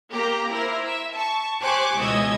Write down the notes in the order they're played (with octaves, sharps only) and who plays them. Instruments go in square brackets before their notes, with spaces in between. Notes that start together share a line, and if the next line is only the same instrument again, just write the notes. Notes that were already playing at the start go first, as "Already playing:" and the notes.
[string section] A#3 G4 A#5
E4 A#4 C5
E5
A5 C#6
G4 C5 G#5 C#6 D6 F#6
C#2 B2 E3 D#5 E6 G#6